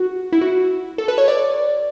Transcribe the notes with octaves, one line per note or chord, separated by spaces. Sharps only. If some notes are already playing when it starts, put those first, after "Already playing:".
Already playing: F#4
E4
F#4
A4
B4
C#5
D5